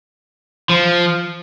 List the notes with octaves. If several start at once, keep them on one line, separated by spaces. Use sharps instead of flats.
F3